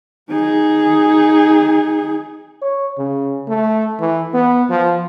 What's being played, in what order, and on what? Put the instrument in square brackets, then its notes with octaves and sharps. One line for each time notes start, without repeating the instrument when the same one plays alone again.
[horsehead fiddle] D#4 G#4
[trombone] C#5
C#3
A3
E3
B3
F3